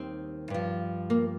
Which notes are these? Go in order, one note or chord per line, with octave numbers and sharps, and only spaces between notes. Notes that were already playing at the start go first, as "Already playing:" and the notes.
Already playing: D#2 D#3 G3 C4
G2 F3
A#3